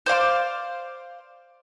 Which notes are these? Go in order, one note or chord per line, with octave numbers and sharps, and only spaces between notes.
C5 D5 F5 C6